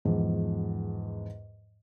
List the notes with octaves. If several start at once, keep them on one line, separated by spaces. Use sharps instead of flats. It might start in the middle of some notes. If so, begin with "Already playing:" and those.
E2 G#2 F3